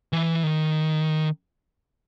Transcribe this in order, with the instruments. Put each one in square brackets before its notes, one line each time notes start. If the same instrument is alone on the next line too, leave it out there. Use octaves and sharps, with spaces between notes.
[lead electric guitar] E3
D#3